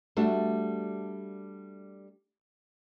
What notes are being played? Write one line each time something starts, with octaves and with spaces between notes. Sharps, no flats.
G3 A3 D4 F#4